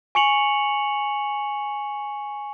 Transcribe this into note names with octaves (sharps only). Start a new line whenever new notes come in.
G#5 C#6 C#7 F7 F#7